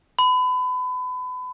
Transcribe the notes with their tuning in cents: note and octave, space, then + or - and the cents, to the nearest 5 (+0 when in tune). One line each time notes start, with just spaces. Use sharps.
B5 +30